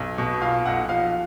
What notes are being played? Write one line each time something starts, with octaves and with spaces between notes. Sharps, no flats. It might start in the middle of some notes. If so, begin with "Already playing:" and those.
Already playing: B1
B2
A#2 F5
B1 F#5
F3 F5